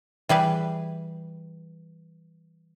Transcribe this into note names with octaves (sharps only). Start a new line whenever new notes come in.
E3 G3 G#4 B4